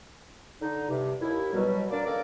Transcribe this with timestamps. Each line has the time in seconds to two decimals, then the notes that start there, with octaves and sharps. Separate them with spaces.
0.62 D3 D#4
0.89 G2 C3
1.21 D#2 E4
1.53 B2 F#3 G3
1.91 A#3 D4 A#4 D5
2.05 C#2 D#3 A#3 A4 A#4 D5